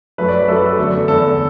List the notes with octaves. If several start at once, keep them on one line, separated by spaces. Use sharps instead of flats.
F#2 F#3 A3 B4
D5
B4
F#2 F#3 A3 A4
B4
A4
E2 D3 A3 A4
E2 D3 A3 A4